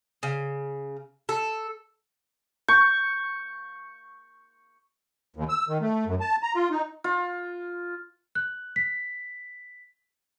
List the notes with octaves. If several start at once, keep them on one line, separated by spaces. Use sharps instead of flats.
C#3
A4
C#6 G6
D#2
E6
D#3
A3
F#2
A5
A#5
F4
D#4
F4
F#6
B6